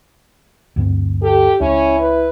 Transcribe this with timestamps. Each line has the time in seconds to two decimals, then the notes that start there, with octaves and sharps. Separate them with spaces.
0.76 D2 G2 C4
1.22 G4 A4
1.60 C#2 C#4 E4
2.00 B4